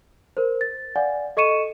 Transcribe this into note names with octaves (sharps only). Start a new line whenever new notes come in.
A#4 C5
A6
D5 F5 F#5 G#5
A4 D#5 C#6 C#7 D#7 E7